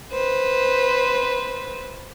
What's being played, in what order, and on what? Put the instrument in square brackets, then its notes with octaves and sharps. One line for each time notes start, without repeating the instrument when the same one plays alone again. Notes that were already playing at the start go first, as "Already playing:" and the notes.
[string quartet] B4 C5